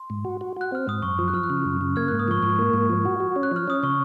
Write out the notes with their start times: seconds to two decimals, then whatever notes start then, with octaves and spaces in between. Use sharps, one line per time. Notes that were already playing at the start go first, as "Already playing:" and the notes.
Already playing: C6
0.10 G#2
0.25 F#4
0.41 F#4
0.56 F#4 F#6
0.72 C4 F6
0.87 G#2 D#6
1.02 F#2 C#6
1.19 F3 D#6
1.28 F#6
1.34 F3 F6
1.43 F#6
1.50 C#3 F6
1.65 F#2
1.81 C#3
1.96 A#3 F6 G#6
2.08 G#2 F#6
2.19 D#6
2.28 F3 C#6
2.42 G#2 C#6
2.59 A#3
2.73 G#2
2.89 F3
3.05 F#4
3.20 F#4
3.36 C#4
3.43 F#6
3.51 F3 F6
3.68 C#4 D#6
3.83 C#3 C#6